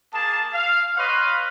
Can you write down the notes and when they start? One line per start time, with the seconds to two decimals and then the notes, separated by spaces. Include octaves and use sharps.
0.13 A#3 G#4 A5
0.53 F5
0.97 B4 C#5 D#5 F5 C6